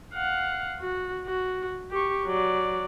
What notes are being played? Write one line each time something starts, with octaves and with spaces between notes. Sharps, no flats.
F5 F#5
F#4
F#4
G4 C#6
F#3 D5